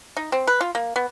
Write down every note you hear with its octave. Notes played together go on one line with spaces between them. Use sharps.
D#4
C4
B4
F4
A#3
B3